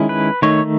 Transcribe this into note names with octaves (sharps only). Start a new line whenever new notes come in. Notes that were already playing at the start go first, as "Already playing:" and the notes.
Already playing: D#3 G#3 C#4 E4
B4
D#3 A3 D#4 C#5